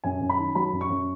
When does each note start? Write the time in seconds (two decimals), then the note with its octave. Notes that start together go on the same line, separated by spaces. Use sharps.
0.04 F#2 G#5
0.21 F#2
0.29 B5
0.38 D#3
0.55 F#3 B5
0.73 F#2
0.81 C#6
0.90 F#2